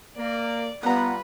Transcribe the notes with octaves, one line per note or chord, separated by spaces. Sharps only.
A#3 D5
G3 B3 F4 B4 F#5 A#5